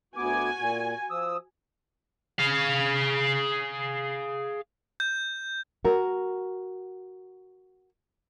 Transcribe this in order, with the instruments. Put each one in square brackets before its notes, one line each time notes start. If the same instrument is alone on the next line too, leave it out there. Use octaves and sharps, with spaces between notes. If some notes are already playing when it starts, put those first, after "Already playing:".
[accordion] D2 B3 D6 [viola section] F#4 G#5
[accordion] A#2
F3 D#6 E6
[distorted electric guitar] G#4 F5
[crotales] G6
[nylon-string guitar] F#4 A#4